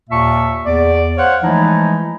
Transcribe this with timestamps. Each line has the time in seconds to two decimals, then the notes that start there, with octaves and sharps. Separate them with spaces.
0.10 D#2 A#2 A#3 E5 A5 C#6
0.65 E2 D5
1.18 C5 C#5 F5 F#5
1.43 E3 F3 G#3 A3 D#4 E4